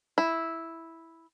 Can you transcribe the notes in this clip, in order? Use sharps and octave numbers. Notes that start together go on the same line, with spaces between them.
E4